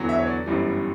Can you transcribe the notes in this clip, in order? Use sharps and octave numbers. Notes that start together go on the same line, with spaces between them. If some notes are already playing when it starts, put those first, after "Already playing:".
Already playing: E2 D3 F#3
E5
C#5
D5
G1 F#2 E3 G3